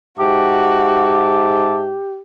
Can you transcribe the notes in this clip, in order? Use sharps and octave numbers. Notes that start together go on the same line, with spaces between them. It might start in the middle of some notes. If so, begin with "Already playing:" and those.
G#2 F#4 G4 E5 A5 D6